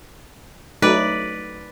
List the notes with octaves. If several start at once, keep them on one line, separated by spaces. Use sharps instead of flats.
F#3 A3 D#4 B4 D5